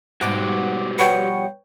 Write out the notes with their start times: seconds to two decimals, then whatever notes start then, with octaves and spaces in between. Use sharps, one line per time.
0.21 G#2 B2 G3 F#4 G4 C5 F#5 D6
0.99 B2 F3 G3 B4 C#5 F#5 G5